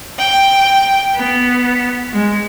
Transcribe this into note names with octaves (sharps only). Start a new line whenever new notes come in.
G5
B3
G#3